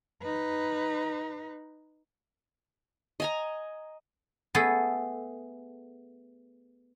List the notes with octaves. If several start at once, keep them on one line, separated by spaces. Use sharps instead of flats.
D#4 B4
D#5 G#5 A#5
A3 B3 G#4 A4